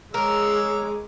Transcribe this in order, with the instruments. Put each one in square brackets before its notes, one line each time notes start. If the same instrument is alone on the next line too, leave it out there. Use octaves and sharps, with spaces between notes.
[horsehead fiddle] G#3 G#4 [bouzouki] A#4 [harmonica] C#5 D6 E6